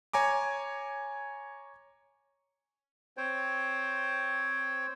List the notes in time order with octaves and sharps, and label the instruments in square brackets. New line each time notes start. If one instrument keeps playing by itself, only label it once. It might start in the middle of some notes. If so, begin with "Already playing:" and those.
[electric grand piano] C#5 G#5 A#5 D6
[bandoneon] C4 C5 C#5 G5